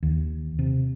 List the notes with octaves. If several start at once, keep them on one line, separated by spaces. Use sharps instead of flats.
D#2
C3